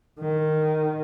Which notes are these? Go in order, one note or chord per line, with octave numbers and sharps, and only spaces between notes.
D#3